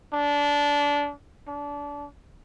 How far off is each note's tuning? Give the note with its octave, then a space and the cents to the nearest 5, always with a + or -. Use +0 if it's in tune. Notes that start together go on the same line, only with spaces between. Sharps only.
D4 -20
D4 -25